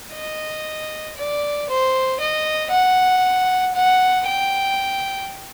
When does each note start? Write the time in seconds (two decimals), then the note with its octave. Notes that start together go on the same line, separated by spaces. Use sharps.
0.14 D#5
1.17 D5
1.69 C5
2.20 D#5
2.71 F#5
3.75 F#5
4.27 G5